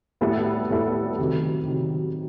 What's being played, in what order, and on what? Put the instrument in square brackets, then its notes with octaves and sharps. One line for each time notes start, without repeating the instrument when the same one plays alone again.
[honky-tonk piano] A2 G3 B3 E4 A4
A2 G3 B3 E4 A4
C3 D#3 F#3
C3 D#3 F#3